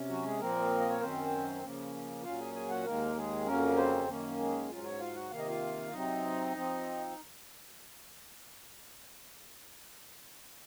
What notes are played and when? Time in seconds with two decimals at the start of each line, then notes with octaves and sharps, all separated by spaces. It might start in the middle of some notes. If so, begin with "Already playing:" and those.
Already playing: C3 C#4
0.09 F#3 F#4
0.24 G#3 G#4
0.39 A#2 F3 A#3 C4 A#4
0.80 D#5
0.90 C#5
1.00 F#2 D#3 F#3 C4 C#4 C5
1.62 C#3 F3 A#3 C#4
2.23 A#2 F#3 C#4 F4 F5
2.39 G#4 G#5
2.55 G#4 G#5
2.69 F#4 F#5
2.85 D#2 D#3 G#3 A#3 A#4
3.16 G#3 G#4
3.46 F2 C#3 F#3 A#3 C#4 A#4
3.77 C4 C5
4.08 F#2 D#3 A#3 C#4
4.38 G#3 G#4
4.69 G#2 F#3 C#4 F4
4.84 C#4 C#5
5.00 F4 F5
5.15 F#4 F#5
5.30 C3 D#3 A#3 F5
5.39 D#5
5.48 F4 F5
5.92 C3 F#3 C4 D#4 D#5
6.55 F3 C4